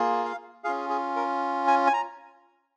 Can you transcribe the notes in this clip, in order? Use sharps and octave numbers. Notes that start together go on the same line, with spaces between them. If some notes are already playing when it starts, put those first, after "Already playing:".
Already playing: A#3 F4 G#4
F5
C#4 F4 G#4 F5
G#4
A#4
G#5
G#5
A#5